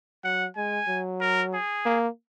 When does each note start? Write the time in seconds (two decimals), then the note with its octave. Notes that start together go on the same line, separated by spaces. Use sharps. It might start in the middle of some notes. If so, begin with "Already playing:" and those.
0.24 F#3 F#5
0.56 G#3 G#5
0.88 F#3
1.21 A#4
1.53 G#4
1.85 A#3